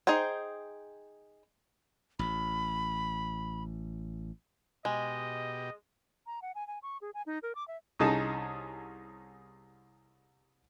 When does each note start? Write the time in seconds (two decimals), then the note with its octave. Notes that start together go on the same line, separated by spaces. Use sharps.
0.07 D#4 G#4 C5 G5
2.19 A1 B5
4.85 B2 G#3 G4 D#5
6.26 A#5
6.42 F#5
6.55 G#5
6.67 G#5
6.83 C#6
7.01 G#4
7.14 G#5
7.26 D#4
7.43 A#4
7.55 D6
7.68 E5
7.99 C2 C#4 D#4 G#4 A5